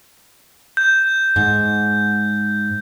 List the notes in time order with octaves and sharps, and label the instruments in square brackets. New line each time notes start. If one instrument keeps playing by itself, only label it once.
[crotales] G6
[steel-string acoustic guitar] G#2